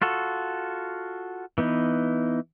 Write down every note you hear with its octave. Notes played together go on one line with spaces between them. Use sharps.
F4 F#4 A4
E3 B3 D#4